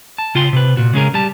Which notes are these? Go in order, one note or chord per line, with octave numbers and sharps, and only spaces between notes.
A5
C#3 F4 G5 C6
C3 B4
A#2 F#4
C#3 G#3 C#4 G#4 A#4
G3 A5